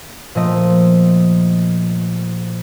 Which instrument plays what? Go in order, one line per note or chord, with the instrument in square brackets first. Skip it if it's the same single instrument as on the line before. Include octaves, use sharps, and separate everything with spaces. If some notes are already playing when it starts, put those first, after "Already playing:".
[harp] A#2 F3 A3 D#5